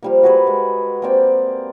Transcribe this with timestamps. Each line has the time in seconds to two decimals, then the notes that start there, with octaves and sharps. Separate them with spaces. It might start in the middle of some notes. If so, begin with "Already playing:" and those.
0.03 F3 G3 A#3
0.23 F#4 G#4 B4
0.47 G#3
1.02 A#3 C4 D5 G5